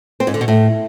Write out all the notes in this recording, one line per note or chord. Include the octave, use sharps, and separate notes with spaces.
C4
G#2
D3
B2
A2